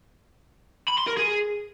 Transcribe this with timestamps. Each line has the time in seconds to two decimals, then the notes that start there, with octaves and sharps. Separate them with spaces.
0.88 B5
0.98 C6
1.07 A#4
1.17 G#4